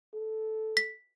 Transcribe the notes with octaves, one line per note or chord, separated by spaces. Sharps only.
A4
B6